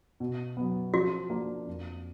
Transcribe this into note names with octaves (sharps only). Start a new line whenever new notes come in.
B2
F#3 B3
F3 F#4
A#3 D4
F2